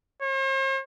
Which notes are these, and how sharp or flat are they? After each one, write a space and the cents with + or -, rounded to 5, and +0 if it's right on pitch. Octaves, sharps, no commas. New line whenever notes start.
C5 +45